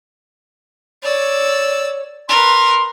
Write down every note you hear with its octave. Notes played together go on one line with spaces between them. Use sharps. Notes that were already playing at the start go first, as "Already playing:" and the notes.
C#5 D5 E6
A#4 B4 C6